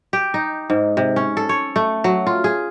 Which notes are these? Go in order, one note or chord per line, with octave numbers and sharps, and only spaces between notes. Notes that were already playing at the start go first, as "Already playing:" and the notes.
G4
D#4
G#2
C3
C#4
A4
C#5
A3
F#3
F4
G#4